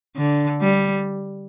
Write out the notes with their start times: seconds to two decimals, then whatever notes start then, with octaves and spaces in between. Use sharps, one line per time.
0.16 D3
0.61 G3